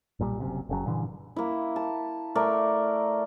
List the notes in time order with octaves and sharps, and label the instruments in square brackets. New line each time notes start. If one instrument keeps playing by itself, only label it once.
[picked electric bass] B1 A#2 D3 G3
F#1 F#2 C3
F#1 C#3 F#3
G2 A#2 D3 E3
[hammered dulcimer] A#3 E4
A5
A3 A#4 D5